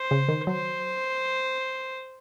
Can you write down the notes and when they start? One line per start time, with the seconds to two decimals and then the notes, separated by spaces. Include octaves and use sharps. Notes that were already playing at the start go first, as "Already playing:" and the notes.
Already playing: C5
0.11 C#3
0.28 D#3
0.47 F#3 C5